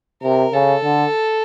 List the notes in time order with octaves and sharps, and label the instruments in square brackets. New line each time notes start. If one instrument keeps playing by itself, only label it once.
[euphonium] C3 [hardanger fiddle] A#4
[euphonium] C#3 [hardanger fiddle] A4
[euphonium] D3